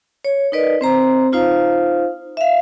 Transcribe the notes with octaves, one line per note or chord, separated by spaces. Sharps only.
C#5
D#4 A#4 B4 D5 D#5
C4 C5 A#5
D#4 F4 C5 F5
E5 F5